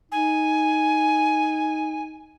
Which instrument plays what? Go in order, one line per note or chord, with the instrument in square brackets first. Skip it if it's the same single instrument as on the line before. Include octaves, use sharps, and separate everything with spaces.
[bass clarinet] D#4 [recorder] G#5